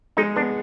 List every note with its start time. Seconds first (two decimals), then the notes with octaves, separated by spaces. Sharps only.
0.17 G#3 D#4
0.36 B3 D4